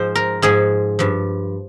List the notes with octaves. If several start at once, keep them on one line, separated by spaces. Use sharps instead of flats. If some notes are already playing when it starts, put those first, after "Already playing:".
Already playing: G#2 F3 C5
A#4
G#2 F3 G#4
G2 F3